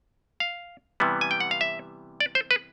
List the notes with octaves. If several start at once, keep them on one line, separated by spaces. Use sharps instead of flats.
F5
C3 E3 G3 B3
G#5
G5
F#5
F5
E5
D5
C5
B4